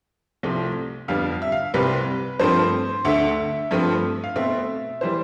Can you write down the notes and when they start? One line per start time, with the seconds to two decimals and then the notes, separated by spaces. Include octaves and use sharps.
0.43 C2 C3 F3 A3 C4
1.08 F2 D3 G3 B3 F5
1.42 E5
1.52 F5
1.74 C2 C3 G3 C4 B4
2.40 G2 F3 A3 C4 C5
3.05 D2 D3 A3 E5
3.71 G2 F3 A3 C4
4.24 F5
4.36 B2 A3 C4 E5
5.01 E3 G3 C5